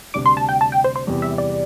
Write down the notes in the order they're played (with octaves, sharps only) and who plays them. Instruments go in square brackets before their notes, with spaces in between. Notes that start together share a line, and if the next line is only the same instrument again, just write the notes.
[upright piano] D2 C3 G3 D4 [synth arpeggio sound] D6
[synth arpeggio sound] C6
A5
G5
A5
G5
C5
C5
[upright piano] E2 C3 G3
[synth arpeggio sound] E5
D5